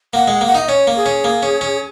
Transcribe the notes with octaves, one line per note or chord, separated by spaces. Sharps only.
A#3 F#5
G#3
A#3
F#5
D#4 D#5
C#4 C#5
A#3
G#4
C#4
A#3
C#4
C#4